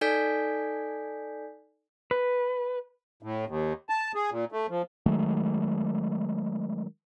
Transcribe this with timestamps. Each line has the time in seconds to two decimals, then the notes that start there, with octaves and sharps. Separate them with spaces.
0.01 D#4 A4 D5 G#5 G6 B6
2.11 B4
3.23 A2
3.48 D#2
3.89 A5
4.15 G#4
4.31 A#2
4.52 A3
4.70 F3
5.06 D#3 F#3 G#3 A3